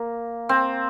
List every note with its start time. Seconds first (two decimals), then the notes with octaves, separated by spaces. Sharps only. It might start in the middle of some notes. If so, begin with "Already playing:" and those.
Already playing: A#3
0.49 C4